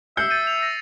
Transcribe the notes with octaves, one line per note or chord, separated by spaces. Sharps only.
E5 E6 G6 C7 C#7
A6 C#7 D#7
F7
A#6